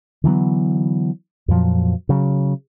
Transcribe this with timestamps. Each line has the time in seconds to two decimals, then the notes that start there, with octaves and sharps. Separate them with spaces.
0.24 D3 E3 F#3 B3
1.48 F2 A#2 F3 F#3
2.09 C#3 F#3